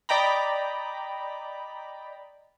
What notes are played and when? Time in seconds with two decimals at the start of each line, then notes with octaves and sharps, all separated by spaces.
0.09 D5 D#5 G5 A#5 B5